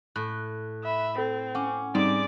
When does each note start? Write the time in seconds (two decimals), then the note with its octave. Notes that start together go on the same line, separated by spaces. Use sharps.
0.16 A2 F#6
0.84 E5 B5
1.18 C4 A4
1.55 C#4 F#5 D6
1.95 G#2 G3 C4 D#4 D5 D6